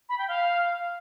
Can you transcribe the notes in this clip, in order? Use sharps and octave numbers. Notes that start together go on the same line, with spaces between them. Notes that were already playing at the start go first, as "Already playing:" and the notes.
B5
G5
F5